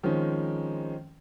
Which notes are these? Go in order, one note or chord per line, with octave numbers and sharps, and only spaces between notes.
D#3 F3 G#3 C4 C#4 D#4